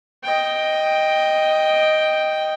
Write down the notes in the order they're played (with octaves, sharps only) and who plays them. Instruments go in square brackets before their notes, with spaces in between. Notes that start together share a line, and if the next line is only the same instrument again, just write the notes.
[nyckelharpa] D#5 G5